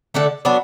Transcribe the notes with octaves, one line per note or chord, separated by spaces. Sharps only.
D3 A3 D4 A4
F#3 B3 D4